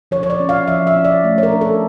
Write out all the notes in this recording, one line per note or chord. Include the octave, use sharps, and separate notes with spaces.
F3 C#5
C#5
D5
C#4
F5
F3 E5
E5
C#4
D5
A3
C#5
A#4
D4
A4